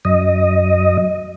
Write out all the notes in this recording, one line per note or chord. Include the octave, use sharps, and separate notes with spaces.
F#2 D#5